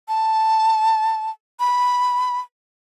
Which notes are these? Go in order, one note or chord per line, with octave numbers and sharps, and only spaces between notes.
A5
B5